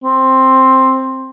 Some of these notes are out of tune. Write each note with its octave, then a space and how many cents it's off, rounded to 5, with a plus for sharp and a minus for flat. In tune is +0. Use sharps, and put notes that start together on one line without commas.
C4 +10